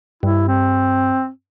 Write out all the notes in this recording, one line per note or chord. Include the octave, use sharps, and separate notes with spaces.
G2 E4
C4